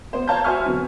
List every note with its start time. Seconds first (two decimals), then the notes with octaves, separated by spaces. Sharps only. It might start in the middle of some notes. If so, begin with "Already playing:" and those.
0.13 B3 C5
0.28 C#5 F5 A5 A#5 G6
0.44 F#4 C5 E5 G#5 C#6 F6
0.66 D3 F#3 B3 C4